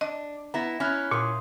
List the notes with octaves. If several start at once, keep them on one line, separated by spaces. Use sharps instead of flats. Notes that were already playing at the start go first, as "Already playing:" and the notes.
D4 D#5
B3 E4 A#5 A#6
C#4 E4 B5 F6 F#6
A#2 F4 C6 D#6